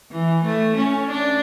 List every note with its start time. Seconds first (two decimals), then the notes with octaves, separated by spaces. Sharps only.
0.11 E3
0.45 A3
0.77 C#4
1.11 D4